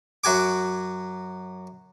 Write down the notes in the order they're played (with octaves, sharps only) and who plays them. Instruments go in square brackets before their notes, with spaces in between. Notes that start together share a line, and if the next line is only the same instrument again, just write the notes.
[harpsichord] F#2 F#4 G#5 D6